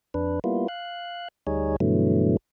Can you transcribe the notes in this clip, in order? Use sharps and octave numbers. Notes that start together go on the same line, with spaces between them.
F2 D4 B4
G3 A#3 B3 E4 F4
F5 F#6
D2 G3 D#4 G#4 C#5
G2 B2 D3 E3 F#3 A3